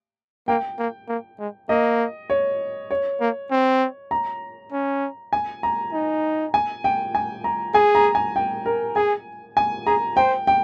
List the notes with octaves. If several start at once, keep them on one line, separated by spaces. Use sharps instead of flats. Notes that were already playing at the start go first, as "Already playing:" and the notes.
A#3 G5
A#3
A#3
G#3
A#3 D#5
C#5
C#5
A#3
C4
A#5
C#4
G#5
A#5
D#4
G#5
G5
G#5
A#5
G#4 G#5
A#5
G#5
G5
A#4
G#4 G#5
G#5
G#4 A#5
C5 G5
G5